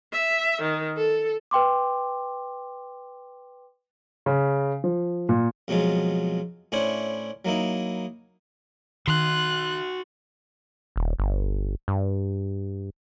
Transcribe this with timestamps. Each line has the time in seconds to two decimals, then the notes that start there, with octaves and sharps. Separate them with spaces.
0.13 E5
0.62 D#3
0.97 A4
1.51 B4 G5 C6 D6
4.26 C#3
4.84 F3
5.29 A#2
5.68 F2 B2 F#3 G#3 F4
6.72 A2 C#4 D4 E4 C5 C#5
7.45 F#3 A#3 D#4 E4
9.07 D#3 F#4 C6 F#6
10.96 D#1
11.18 G1
11.88 G2